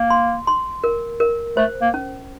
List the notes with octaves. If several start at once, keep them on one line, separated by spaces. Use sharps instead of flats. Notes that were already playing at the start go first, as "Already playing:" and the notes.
Already playing: A#3
C6
C6
A#4
A#4
A3 C5
A#3
C#4